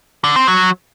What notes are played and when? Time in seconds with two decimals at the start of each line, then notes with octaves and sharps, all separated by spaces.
0.24 D3
0.36 C4
0.48 F#3